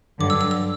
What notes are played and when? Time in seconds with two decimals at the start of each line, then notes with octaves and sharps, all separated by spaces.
0.20 G2 D3 F#3 D6
0.30 E6
0.41 E6
0.51 E6